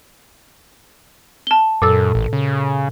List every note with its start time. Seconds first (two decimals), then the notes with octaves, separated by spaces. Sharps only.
1.47 A5 G7
1.82 F#2 A#2 A4 E6
2.15 A1
2.33 C#3